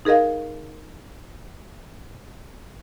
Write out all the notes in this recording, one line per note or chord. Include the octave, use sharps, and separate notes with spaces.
D#4 G#4 A#4 D#5 F5